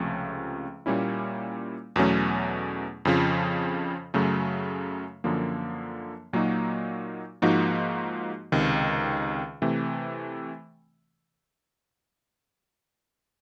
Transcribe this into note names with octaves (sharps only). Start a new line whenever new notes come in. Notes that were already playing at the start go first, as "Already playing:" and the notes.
Already playing: C#2 C3 F3 A3 C#4
A#2 G3 A#3 C#4 E4
E2 B2 F#3 A3 C#4
F2 C#3 F3
F#2 C#3 F#3 A3
F#2 D3 F3 A#3
A#2 F#3 A#3 D#4 F#4
G#2 F3 A#3 D#4 F#4
C#2 C3 D#3
C3 E3 A3